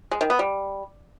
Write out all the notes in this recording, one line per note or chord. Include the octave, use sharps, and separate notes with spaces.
G#3
D#3
B3
G3